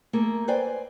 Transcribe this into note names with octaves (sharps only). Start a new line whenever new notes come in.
A3 A#3 G#4
B4 C5 D5 G5 G#5